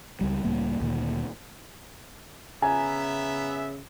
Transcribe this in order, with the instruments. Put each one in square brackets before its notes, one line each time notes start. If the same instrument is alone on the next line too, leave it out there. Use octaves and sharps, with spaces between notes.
[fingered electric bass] C#2 G3
C#2 A2 G3 A#3
D2 A#2 D#3
[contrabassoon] C#3 [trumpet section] B3 E5 [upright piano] G#5 [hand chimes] A#5